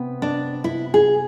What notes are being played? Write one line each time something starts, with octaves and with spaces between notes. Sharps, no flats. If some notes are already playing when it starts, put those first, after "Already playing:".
Already playing: C3 B3
D4
E4
G#4